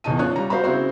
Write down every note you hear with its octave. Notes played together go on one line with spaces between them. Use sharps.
D#1 E2 B2 D#4 A5 D#7
F#2 D4 F4 C#5 F#6
G3 A#5
F#4 C5 F5 A#5 B5
C#3 C4 E4 F#4 C5